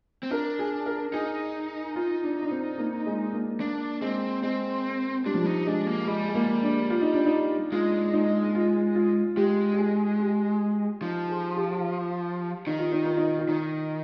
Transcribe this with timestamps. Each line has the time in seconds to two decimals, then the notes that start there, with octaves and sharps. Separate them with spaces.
0.23 C4
0.31 D4 A#4
0.59 G#4
0.86 A#4
1.13 D#4 G#4
1.96 F4
2.24 D4
2.42 D4
2.50 C4
2.78 A#3
3.06 G#3
3.33 A#3
3.60 A#3 D4
4.02 G#3 C4
4.43 G#3 C4
5.26 G3 D4
5.34 F3
5.42 G3 D#4
5.67 G#3 D4
5.87 A#3
6.08 G3 G#3
6.29 G#3
6.35 A#3
6.63 D4
6.90 F4
7.02 D#4
7.14 D4
7.26 D#4
7.72 G#3 F4
8.14 D#4
8.55 F4
8.95 F4
9.37 G#3 G4
9.73 G4
9.78 G#4
10.20 G4
11.02 F3 D#4
11.29 G#4
11.56 G4
12.67 D#3 D#4
12.79 F4
12.92 D#4
13.04 F4
13.17 D#4
13.38 F4
13.48 D#3 D#4